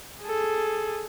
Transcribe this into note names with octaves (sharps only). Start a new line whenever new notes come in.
G#4 A4